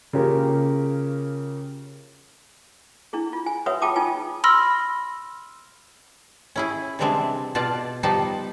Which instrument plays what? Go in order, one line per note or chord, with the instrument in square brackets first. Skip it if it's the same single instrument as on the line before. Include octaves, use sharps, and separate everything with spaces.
[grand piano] C#3 A#3 C#4 F4 G4 A#4
[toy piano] D4 E4 G#4
F4
G#5
F#4 B4 C#5 E5 F#5 D#6
F4 G#4 G5 A5 D6 D#6
D#4 F4 G#5
[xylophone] B5 C6 E6 F6 A#6
[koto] C#4 E4 G#4
C3 E3 G3 G#3 C4 D4
B2 F4 D5 A5
F3 G3 B3 D#4 G4 A5